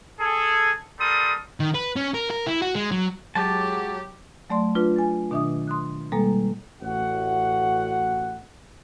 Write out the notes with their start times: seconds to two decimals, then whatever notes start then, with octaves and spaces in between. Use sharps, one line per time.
0.19 G#4 A4
1.00 G3 A4 A#4 C6 D#6
1.60 D#3
1.75 B4
1.96 C#4
2.14 A#4
2.30 A#4
2.46 E4
2.62 F#4
2.75 G#3
2.92 F#3
3.35 F#3 G#3 G4 A5
4.50 F#3 A3 D5 C6
4.75 D4 F4 B4
4.96 G#5 A6
5.31 B2 D#3 D4 E5 D#6
5.68 C6 D#6 F#6
6.12 B2 G3 G#3 A#3 A4 A#5
6.82 A1 F#4 F#5